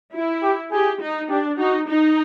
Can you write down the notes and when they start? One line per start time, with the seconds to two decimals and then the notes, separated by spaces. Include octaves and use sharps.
0.14 E4
0.43 G4
0.72 G4 G#4
1.01 D#4
1.29 D4 G4
1.58 D#4 F#4
1.88 D#4